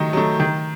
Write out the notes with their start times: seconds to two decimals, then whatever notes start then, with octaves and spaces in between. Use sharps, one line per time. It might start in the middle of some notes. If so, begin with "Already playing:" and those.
Already playing: D#3 F#3 A3 D#5
0.13 F#3 A3
0.40 D#3